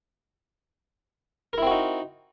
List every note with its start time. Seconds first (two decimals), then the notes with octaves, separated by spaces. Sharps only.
1.53 A#4
1.58 E4
1.62 C4
1.67 F#4
1.71 D#4